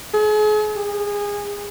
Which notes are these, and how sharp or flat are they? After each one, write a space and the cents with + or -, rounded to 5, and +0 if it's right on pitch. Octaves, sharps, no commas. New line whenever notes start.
G#4 +40
G#4 -25